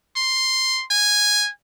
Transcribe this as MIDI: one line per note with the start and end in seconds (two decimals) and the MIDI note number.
0.16 0.84 84
0.91 1.50 80